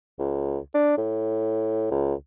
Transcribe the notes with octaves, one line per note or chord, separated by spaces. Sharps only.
C#2
D4
A2
C#2